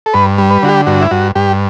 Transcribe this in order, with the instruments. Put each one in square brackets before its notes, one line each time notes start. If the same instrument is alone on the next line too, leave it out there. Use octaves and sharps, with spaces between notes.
[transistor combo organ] A4
G2 B4
G3
B4
D3 F#4
G4
G2 F#4
E4
G2 F#4
G2 G4